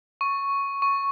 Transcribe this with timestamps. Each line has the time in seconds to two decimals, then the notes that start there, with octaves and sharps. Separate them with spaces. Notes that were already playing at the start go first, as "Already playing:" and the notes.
0.21 C#6
0.82 C#6